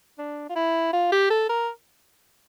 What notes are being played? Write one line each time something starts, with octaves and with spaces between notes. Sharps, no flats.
D4
F4
E4
F4
G4
A4
A#4